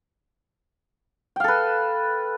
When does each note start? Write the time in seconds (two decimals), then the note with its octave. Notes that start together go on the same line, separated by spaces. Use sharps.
1.36 G5
1.40 F5
1.44 A4
1.48 B4